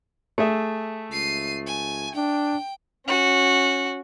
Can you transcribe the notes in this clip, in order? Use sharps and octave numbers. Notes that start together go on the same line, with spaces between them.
A3 G#4 E5
C#2 C7 D#7
G#5
D4 G5
C#4 F#4